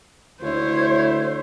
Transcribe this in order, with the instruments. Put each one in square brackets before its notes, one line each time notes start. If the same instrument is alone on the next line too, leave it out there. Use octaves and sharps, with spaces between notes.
[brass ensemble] D2 E4 [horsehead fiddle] C5 C#5